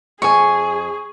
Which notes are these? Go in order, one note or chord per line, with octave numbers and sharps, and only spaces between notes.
F2 G#4 G#5 C#6